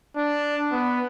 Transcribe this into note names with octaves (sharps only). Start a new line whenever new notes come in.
D4
B3